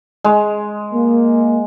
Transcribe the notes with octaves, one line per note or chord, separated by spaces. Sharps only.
G#3
A#3